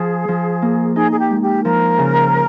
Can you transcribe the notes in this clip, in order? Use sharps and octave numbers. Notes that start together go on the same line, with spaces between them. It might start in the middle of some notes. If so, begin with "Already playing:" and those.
Already playing: F3 G#4
F3
A#3
D#4 G#4
G#4
G4
G#3
G4
F3 A#4
C#3